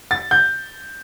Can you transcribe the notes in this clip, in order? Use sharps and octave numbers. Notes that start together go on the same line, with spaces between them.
A6
G6